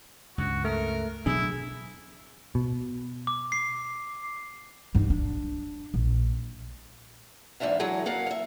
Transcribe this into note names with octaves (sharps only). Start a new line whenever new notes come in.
C#2 G2 F#4
A3 A#4
B2 F#3 D4 E4 G#4
B2
D6
C7
G2 D#4
D4
A#1
E2 G#2 G#3 D4 E5 F5
E3 F#3 G#3 G#4 A4
F#2 A#3 F5 F#5
E5 F5